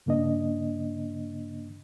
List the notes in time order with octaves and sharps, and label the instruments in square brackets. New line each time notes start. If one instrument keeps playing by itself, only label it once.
[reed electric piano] G2 C#3 A#3 D4 D#5